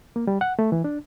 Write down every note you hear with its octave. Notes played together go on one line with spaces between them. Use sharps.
A#3
G3
F#5
A3
E3
D4